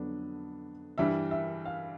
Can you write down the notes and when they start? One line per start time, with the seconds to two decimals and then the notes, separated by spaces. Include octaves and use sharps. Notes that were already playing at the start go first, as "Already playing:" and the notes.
Already playing: F2 D3 F#3 B3 D4
0.98 G2 E3 G3 E5
1.31 E5
1.65 F5